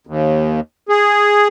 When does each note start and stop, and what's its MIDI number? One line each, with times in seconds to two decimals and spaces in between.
0.07 0.60 39
0.89 1.48 68